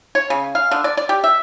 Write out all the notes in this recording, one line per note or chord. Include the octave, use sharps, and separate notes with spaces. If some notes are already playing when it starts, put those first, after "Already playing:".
C#5
C#3
F5
D3
D5
D5
G4
E5